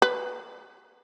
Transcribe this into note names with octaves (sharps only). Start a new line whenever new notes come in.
B4